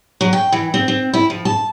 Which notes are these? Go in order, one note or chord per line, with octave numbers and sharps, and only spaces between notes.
F#3
G5
E3
C4
C4
E4
F3
A5